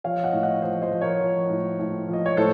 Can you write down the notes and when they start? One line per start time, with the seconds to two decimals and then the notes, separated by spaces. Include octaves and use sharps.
0.04 F3 C#5 F5
0.23 D#5 F#5
0.33 A2
0.43 D#5 F#5
0.62 F3 C5 D#5
0.82 C5 D#5
0.91 F3
1.01 A#4 C#5
1.21 F3
1.50 A2
1.79 A2
2.08 F3
2.13 D#5
2.26 C#5
2.37 A2 A4 C5